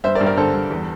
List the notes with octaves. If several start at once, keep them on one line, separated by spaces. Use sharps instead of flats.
G2 C5 E5
A#4 D5
G2
A#4 D5
D3 A4 C5
G2
E2